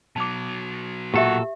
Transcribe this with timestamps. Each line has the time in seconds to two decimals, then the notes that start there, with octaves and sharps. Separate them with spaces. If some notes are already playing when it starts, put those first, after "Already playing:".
0.16 B2 F#3 A5 D6
1.14 A#2 F#4 G4 A4 E5